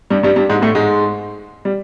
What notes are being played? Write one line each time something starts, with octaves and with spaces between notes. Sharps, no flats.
G2 G3
G2 G3
G2 G3
G#2 G#3
A2 A3
G#2 G#3
G3